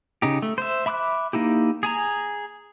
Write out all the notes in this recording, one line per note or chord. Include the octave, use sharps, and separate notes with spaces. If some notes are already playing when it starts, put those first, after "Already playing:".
C#3 D#4 G4
A3
C5 E5
E5 B5 D6 E6 F#6
A#3 D#4 E4 G4
G#4 G#5 A#5